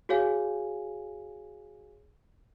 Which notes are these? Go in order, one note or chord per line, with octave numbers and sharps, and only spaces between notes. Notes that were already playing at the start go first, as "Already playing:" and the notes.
F#4 G#4 C#5 F5 G#5